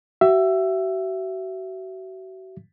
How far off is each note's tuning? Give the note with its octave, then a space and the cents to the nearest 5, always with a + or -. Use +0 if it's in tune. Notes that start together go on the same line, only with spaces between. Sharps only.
F#4 +40 E5 +15